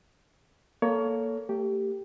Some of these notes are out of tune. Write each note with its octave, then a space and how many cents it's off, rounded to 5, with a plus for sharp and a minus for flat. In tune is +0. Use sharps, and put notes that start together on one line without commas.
A#3 +0 A4 +0 C#5 +25
A3 +40 G4 +0